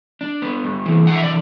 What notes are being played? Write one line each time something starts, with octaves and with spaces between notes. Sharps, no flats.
D4
B3
G2
E3
D4 F#5
E5
D5